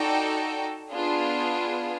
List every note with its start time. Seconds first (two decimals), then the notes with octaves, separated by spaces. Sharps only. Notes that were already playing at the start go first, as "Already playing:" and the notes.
Already playing: D#4 F#4 A4 D5 G5
0.90 B3 D4 F4 G#4